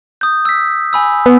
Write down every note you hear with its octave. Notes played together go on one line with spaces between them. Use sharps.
D#6 G6
E6 B6
G#5 B5 E6
B3